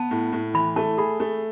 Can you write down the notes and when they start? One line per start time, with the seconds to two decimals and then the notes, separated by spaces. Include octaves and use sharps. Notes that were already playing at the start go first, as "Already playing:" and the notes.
Already playing: B3 A5
0.11 A2
0.32 A2
0.54 E3 B5
0.76 A3 A5
0.98 G#4 B5
1.20 A3